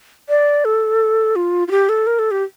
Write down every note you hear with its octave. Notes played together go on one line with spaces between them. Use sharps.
D5
A4
F4
F4
G4
A4
A#4
A4
G4